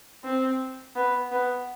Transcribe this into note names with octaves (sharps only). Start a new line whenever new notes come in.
C4
B3
B3